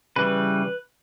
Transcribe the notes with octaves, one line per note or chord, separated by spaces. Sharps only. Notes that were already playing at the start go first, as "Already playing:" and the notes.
C#3 E3 G3 B4